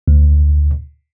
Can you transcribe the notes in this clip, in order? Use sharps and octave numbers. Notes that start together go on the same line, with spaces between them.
D2